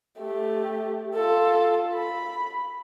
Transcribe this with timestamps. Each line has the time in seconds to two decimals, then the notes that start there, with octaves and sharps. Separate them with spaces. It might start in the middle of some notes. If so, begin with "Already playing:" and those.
0.18 A3 G4
1.14 F4 A4
1.95 B5